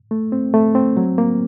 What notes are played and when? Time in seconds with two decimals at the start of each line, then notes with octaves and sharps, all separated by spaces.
0.11 A3
0.32 C4
0.54 A3
0.75 C4
0.97 F#3
1.18 A#3